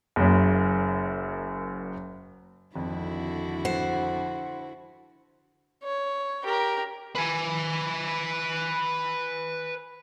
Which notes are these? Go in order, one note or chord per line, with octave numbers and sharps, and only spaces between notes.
F#1 F#2
G#1 F2 D3 E4 F#4
C5 F#5
C#5
G4 A#4
B4 G#5